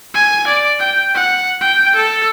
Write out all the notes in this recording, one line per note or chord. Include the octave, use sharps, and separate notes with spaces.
G#5
D5
G5
F#5
G5
A4